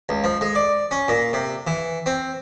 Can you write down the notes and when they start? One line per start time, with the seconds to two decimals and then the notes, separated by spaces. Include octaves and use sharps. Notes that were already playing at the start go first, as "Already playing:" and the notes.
0.09 C#2
0.24 F3
0.41 G#3
0.55 D5
0.91 C#4
1.08 A#2
1.33 C3
1.67 E3
2.06 C4